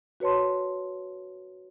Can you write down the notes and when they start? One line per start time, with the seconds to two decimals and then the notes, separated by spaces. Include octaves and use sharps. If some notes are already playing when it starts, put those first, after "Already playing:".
0.20 F#4 B4 C#5 A5 C6